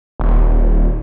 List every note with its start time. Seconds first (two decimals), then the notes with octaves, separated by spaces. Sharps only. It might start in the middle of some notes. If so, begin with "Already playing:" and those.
0.20 D#1